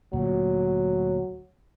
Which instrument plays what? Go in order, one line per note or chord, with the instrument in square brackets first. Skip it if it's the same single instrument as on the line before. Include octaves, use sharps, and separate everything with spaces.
[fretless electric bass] D2 A#2 [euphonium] F#3